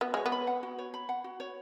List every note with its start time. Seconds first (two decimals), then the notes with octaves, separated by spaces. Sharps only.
0.01 B3 F#4
0.14 G#3 C#5
0.26 B3
0.32 B5
0.47 F#5
0.63 F#4
0.78 C#5
0.94 B5
1.09 F#5
1.24 F#4
1.40 C#5